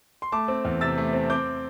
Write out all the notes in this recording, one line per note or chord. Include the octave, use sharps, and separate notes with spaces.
C6
A3 A5 D6
C4
E2
C3 E6 A6
A3
C4
C4 D6 G6